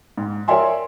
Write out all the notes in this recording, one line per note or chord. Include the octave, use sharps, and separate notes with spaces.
G#2
A#4 C#5 D5 E5 G#5 C6